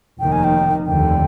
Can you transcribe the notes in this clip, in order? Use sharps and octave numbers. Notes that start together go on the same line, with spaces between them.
F1 D#2 D#3 G5
G#5
G5
F1 D#2 D3 G5